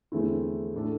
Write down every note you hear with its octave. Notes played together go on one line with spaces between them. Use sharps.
E2 D3 A3 C4 E4
A2 A3 D4 A4